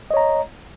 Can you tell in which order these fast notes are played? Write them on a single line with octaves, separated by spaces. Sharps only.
D#5 C#5 A#5